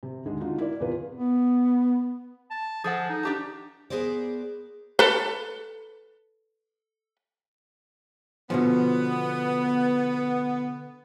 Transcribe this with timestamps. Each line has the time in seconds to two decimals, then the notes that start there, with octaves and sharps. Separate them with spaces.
0.03 C3
0.25 D#2 D3 G#3
0.40 D4 D#4 F4 F#4
0.58 E4 A#4 D5
0.80 E2 C3 F4 B4
1.17 B3
2.50 A5
2.84 F3 G#4 A4 F#5
3.09 D#4
3.23 D4 G4 A5
3.90 B3 G#4 A#4 C5 D5
4.99 A4 B4
8.50 B2 D3 F3 B3